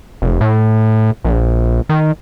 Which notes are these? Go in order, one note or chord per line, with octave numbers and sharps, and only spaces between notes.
F1
A2
A#1
D#3